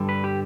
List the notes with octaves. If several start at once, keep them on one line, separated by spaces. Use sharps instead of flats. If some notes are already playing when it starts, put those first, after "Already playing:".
Already playing: G2 D3 G3
B4
G4